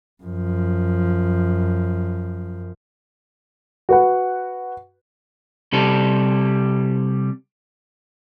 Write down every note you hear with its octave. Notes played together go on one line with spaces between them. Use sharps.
F#2 F3
F#4 B4 F#5
C3 G3 A4